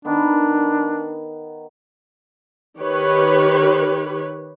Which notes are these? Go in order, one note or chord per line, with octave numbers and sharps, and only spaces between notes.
D#3 B3 D4
D#3 G4 B4 C#5